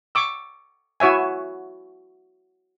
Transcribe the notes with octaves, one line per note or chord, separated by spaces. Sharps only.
C#6 D6 E6
E4 F#4 C#5 E5 G#5